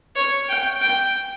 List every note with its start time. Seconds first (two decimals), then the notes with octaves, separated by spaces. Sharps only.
0.16 C#5
0.49 G5
0.82 G5